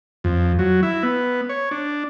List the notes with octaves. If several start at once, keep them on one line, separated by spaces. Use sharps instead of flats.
F2
F#3
E4
B3
C#5
D4